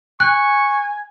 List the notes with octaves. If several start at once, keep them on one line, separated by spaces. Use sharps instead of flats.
G#5 C#6 F#6